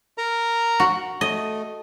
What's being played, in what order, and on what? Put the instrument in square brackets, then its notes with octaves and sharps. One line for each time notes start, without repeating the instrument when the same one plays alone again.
[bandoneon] A#4 A#5
[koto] F#4
[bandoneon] A3 [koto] D#5